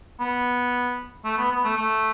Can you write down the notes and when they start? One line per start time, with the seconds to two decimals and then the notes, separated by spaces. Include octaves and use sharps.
0.20 B3
1.25 A3
1.38 B3
1.51 B3
1.65 A3
1.77 A3